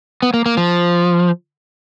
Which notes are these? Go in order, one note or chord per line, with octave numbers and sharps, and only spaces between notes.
B3
A#3
A#3
F3